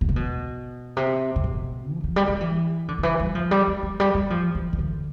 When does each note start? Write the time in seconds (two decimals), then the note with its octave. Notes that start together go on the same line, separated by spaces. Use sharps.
0.01 B2
0.09 C3
0.16 B2
0.97 C3
1.36 C3
1.44 B2
1.93 F3
2.04 F3
2.16 G3
2.28 F3
2.41 E3
2.88 D3
2.98 D3
3.03 E3
3.19 G3
3.35 F3
3.51 G3
3.67 G3
3.83 F3
4.00 G3
4.14 G3
4.30 F3
4.55 E3
4.73 E3
4.79 D3